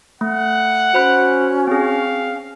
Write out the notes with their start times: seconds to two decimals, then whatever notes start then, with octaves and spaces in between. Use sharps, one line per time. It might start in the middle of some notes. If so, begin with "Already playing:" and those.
0.21 A3 F#5
0.94 C#4 F#4 C5 B5 F#6
1.67 C4 G#4 F5